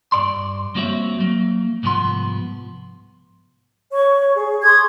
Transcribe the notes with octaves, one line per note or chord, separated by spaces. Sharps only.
G2 D5 C6
G3 A#3 C4 F#4 C#5 E5
F#3 A#3
C2 G#2 F3 B3 C6
C#5 C#6
G#4
C6 C#6 D#6 G#6